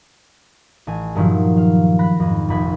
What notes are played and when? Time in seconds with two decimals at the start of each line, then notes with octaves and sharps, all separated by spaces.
0.87 A1 G#5
1.15 G2 A#2 D#3 F3 F#3 E4
1.57 F5
1.99 B5 F#6 A#6
2.20 F2 G#2
2.48 F1 A#1 F3 B5 G#6